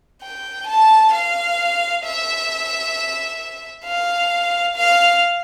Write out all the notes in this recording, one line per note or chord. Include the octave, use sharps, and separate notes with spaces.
G5
A5
F5
E5
F5
F5